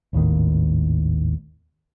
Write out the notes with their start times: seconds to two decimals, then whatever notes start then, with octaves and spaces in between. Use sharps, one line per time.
0.13 G#1 D#2 A2 D#3